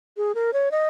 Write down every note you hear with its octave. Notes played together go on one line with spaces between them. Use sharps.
G#4
A#4
C#5
D#5